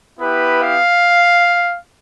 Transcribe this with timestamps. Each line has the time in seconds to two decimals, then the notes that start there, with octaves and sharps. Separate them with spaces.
0.19 B3 E4 G4 B4
0.62 F5